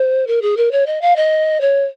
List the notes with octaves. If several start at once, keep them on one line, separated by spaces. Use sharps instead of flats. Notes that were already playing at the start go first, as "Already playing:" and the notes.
Already playing: C5
A#4
G#4
A#4
C#5
D#5
F5
D#5
C#5